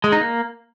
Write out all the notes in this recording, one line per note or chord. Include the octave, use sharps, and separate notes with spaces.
G#3
D#4
A#3